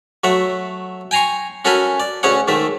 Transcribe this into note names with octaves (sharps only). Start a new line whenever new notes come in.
F#3 A3 E5 F#5
G5 G#5 A#5 C6 C#6
C#4 F#4 A4 A#4 G#5 B5
D5
D2 C#4 G#4 C#5 F#5
G#2 D#3 A3 E5